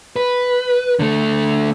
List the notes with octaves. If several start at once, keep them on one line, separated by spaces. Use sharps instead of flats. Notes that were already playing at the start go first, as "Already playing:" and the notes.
B4
D3 A3